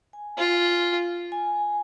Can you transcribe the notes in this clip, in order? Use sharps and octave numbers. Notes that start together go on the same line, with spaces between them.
G#5
F4
G#5